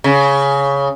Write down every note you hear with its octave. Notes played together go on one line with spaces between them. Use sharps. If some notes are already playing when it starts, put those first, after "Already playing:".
C#3